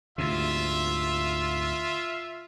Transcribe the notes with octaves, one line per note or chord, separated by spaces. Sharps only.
D2 G#2 C3 F4 E5